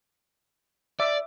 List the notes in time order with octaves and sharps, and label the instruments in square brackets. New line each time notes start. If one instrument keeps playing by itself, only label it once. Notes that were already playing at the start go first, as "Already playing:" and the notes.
[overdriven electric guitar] D5 [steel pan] E5 D6